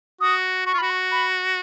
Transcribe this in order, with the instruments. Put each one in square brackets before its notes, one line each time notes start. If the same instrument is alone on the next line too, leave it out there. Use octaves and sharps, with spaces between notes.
[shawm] F#4 [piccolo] D#6
[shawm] F#4 [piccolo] C#6
[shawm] F4
[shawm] F#4 [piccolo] B5
[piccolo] C#6
B5